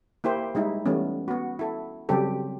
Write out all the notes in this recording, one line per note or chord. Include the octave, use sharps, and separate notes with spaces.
A#3 E4 G4 C5
G3 G#3 D#4 E4
E3 G3 A3 B3 C#4
B3 F#4
E4 A4
C#3 F#3 G3 C4 G4 A4